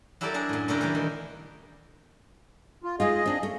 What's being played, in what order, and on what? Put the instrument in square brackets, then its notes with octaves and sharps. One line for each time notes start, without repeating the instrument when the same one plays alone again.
[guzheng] F#3 E4 G4 A4 A#4 D5
D4 G#4 A#4
F#2 A2
A#2 C#3 D4 E4 G4 A#4
E3 G3 A#3
D#3
[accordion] F4
[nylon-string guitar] G#3 D#4 F4 [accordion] G#4 D#5
[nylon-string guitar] C4 D4
A3